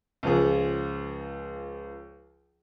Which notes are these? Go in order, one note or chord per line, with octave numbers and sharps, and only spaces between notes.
C#2 F3 G#4